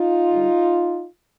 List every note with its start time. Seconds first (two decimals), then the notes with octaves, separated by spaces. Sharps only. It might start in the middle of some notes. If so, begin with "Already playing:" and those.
Already playing: D#4 F4
0.31 G2 D3 G3